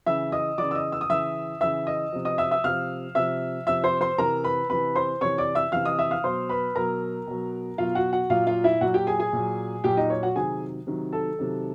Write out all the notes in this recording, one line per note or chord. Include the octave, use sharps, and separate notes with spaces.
C#3 E3 E5 E6
D#5 D#6
C#3 E3 D5 D6
E6
D#5 D#6
E6
D#6
C#3 E3 E5 E6
C#3 E3 E5 E6
D#5 D#6
C3 F3
D#5 D#6
E5 E6
E5 E6
C3 F3 F5 F6
C3 F3 E5 E6
C3 F3 E5 E6
C5 C6
C5 C6
C3 E3 A#4 A#5
B4 B5
C3 E3 B4 B5
C5 C6
C3 E3 C#5 C#6
D5 D6
E5 E6
C3 E3 F5 F6
D#5 D#6
E5 E6
F5 F6
B2 F#3 C5 C6
B4 B5
B2 F#3 A#4 A#5
B2 F#3
B2 F#3 F4 F5
F#4 F#5
F#4 F#5
A#2 F#3 F4 F5
F4 F5
E4 E5
A#2 F#3 F#4 F#5
G4 G5
G#4 G#5
G#4 G#5
A#2 F#3
A#2 F#3 G4 G5
D#4 D#5
C#5
F#4 F#5
C3 D#3 F#3 G#4 G#5
C3 D#3 F#3
A4 A5
C3 D#3 F#3